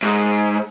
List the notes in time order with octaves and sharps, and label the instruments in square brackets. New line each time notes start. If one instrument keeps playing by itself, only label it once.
[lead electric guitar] G#2